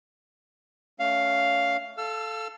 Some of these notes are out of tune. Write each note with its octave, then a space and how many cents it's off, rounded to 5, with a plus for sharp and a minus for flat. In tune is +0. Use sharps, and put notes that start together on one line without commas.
A3 +0 C#4 +25 F5 +0
A4 -5 F5 +0 E6 +40